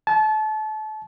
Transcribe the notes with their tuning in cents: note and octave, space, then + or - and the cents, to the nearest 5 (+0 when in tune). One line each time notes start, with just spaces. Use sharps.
A5 -30